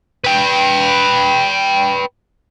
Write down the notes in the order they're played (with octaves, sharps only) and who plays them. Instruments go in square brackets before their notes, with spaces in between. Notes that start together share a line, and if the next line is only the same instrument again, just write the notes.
[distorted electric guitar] B4 G5